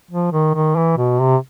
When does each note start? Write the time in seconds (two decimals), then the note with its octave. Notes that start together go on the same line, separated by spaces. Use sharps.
0.11 F3
0.32 D#3
0.55 D#3
0.76 E3
0.98 B2
1.20 C3